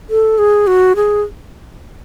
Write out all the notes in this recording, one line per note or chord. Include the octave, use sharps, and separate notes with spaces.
A4
G#4
F#4
G#4